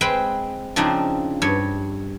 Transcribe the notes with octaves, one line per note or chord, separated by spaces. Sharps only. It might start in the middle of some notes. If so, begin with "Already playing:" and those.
G#3 C4 B4 G5 B5
C#3 F3 C4 D4 D#4
G2 C#5